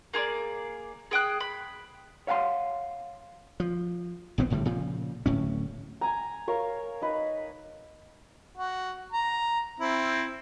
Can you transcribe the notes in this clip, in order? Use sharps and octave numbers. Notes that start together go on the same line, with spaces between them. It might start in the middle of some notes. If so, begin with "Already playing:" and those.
A#3 G#4 C#5 D5
G#4 G5 D#6 F#6
B5
C#5 F5 F#5 A5 C6
F3
A#1 D#2 B3 C4
G#1 A2 D3 G3
A#2 C#3 F3
D1 A2 C#4
G#5 A#5
A#4 C#5 F5
D#4 B4
F#4
A#5
C4 E4